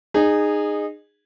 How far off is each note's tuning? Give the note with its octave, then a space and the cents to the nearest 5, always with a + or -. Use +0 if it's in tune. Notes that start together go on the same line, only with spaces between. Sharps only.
D#4 -25 G#4 -10